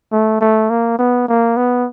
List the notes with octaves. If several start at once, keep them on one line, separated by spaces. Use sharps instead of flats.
A3
A3
A#3
B3
A#3
B3